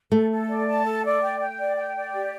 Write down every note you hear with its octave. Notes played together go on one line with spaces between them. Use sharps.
A3 A4
A4
D5
A5
A4
D5
G5
G5
D5
G5
D5
G4